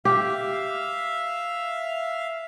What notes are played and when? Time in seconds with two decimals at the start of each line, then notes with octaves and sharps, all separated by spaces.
0.05 G4 E5 F5